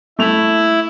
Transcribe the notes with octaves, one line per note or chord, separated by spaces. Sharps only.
A3 E4 F7